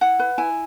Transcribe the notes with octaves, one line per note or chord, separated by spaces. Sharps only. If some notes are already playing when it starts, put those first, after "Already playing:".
E4 F#5
B4
E4 G#5